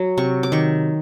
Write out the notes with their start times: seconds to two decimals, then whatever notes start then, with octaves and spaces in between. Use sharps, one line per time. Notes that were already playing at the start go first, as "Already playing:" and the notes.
Already playing: F#3
0.17 C3 C#6
0.43 D6
0.52 D#3 C#6